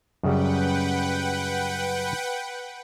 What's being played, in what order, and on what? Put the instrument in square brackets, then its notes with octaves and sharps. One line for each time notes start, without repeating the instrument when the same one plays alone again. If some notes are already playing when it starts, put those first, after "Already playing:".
[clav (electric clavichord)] F#2 C#3 G3 [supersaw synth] B4 F#5 G5